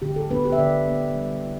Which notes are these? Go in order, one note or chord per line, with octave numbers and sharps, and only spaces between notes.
D3 G4
A4
B3 D4 B4
G4
E5
D3 D5
B3 D4
G3
E4